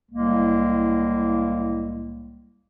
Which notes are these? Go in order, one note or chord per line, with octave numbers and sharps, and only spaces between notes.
C2 A2 G#3 A#3